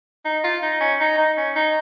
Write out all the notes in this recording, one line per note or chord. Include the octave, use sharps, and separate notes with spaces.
D#4
F4
D#4
C#4
D#4
D#4
C#4
D#4